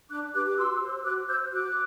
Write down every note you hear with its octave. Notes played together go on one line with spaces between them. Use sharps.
D4 D6 F#6
G4 B4 D6 F#6
D6
F#4 C6 E6
C5
F#4 D6 F#6
C5 E6 G6
F#4 D6 F#6